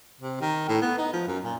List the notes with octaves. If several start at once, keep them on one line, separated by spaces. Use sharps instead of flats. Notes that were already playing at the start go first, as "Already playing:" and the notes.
C3
D#3
A2
B3
D#4
F3
F#2
A#2